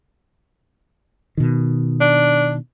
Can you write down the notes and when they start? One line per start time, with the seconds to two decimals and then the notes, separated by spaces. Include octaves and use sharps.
1.37 B2 D#3
2.01 D4